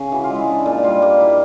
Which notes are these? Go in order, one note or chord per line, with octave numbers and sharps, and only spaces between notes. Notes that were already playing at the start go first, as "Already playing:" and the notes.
Already playing: C#3
E3 F#4
F4
G#3
E4
D4
A#2
G3 F4
A#3 G4
E4